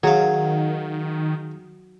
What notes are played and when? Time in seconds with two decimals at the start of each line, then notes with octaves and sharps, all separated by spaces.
0.03 D#3 F#3 G#4 F5